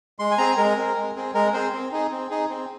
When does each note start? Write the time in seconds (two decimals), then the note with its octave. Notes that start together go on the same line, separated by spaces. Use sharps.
0.19 G#3 C6
0.31 G#5
0.38 C4 G#4 A#5
0.57 G#3 A#4
0.77 C4 G#4
0.96 G#3
1.16 C4 G#4
1.34 G#3 A#4
1.53 C4 G#4 C5
1.73 C4
1.92 D#4 G#4
2.11 C4
2.30 D#4 G#4
2.50 C4